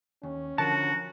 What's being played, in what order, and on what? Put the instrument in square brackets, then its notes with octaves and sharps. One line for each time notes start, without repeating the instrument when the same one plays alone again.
[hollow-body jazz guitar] D#2 [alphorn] C#4
[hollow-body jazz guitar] D3 F3 A#4 [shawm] F#4 [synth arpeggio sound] A5